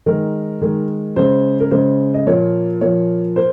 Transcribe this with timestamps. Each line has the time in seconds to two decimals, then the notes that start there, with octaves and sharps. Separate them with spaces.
0.06 D#3 G#3 A#4
0.62 D#3 G#3
1.16 C#3 G#3 C5
1.60 A#4
1.71 C#3 G#3 C5
2.14 D#5
2.26 A#2 F3 A#3 C#5
2.81 A#2 F3 A#3 C#5
3.36 A#3 C5